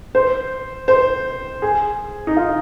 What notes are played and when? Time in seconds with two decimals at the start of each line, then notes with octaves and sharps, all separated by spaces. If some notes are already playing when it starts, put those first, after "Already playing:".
0.15 C5
0.88 C5
1.62 G#4
2.27 D#4
2.37 F4